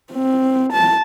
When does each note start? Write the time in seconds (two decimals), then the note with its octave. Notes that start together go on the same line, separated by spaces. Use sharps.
0.13 C4
0.73 A5